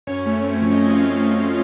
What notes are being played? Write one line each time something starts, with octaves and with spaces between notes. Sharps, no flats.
F#2 C#4 C#5
A3
C4
F3
D#5
F#2 C#4 C#5
F4 F5
A3
C#4 C#5
C4
F3